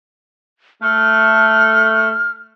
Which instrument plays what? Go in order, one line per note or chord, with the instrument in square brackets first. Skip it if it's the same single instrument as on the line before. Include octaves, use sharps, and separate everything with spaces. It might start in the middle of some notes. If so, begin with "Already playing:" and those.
[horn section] A3 [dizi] F6